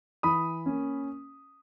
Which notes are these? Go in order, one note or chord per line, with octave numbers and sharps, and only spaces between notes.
E3 B5 D#6
A#3 C#4